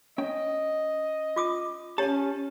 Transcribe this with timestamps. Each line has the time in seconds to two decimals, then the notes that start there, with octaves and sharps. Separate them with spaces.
0.18 C#4 D#5 G5
1.36 F4 D6 D#6
1.98 C#4 G4 C#5 G#5 A5